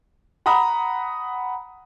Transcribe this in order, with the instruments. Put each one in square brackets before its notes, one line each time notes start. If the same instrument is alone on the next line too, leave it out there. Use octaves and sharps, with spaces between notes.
[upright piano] F#5 A#5 B5 D#6